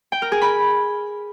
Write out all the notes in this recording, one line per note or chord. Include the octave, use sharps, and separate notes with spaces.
G5
A#4
G#4
B5